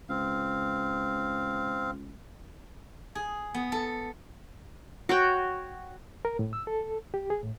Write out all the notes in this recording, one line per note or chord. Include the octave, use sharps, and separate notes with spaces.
C#2 C4 F5
G#4
B3
A4
F#4 C#5 G5
A#4
A2
E6
A4
G4
G#4
A2